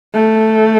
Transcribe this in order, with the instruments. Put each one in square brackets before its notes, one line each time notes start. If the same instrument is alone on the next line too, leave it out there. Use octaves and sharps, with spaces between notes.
[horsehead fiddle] A3